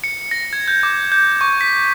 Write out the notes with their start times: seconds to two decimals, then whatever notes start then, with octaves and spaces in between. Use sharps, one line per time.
0.04 C#7
0.31 A#6
0.53 G#6
0.68 G6
0.83 D6
1.12 G6
1.41 C#6
1.61 B6